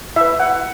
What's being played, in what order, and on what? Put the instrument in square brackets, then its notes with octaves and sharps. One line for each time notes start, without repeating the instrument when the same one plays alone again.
[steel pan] E4 B4 E5
F#5